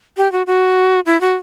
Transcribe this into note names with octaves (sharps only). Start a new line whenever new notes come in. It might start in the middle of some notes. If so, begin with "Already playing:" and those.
G4
F#4
F#4
E4
F#4